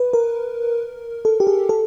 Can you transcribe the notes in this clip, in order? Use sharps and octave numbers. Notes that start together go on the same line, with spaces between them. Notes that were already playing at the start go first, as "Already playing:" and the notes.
Already playing: B4
A#4
A4
G4
G#4
A4